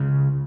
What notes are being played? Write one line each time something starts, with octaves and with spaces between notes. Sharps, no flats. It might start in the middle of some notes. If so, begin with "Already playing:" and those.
Already playing: C#2 C#3